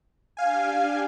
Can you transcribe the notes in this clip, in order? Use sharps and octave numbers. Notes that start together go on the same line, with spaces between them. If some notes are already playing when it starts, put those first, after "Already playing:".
D4 G4 F5 G#5